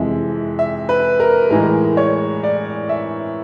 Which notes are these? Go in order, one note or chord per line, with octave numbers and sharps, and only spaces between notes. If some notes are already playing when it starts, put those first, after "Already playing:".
Already playing: F2 C3 E3 G#3 E5
E5
B4
A#4
A2 E3 G#3 A#4
C#5
D5
E5